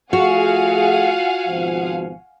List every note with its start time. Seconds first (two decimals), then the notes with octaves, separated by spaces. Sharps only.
0.13 F3 A3 F4 F#4 G#4 F5 F#5 G#5
1.48 G#1 B2 F3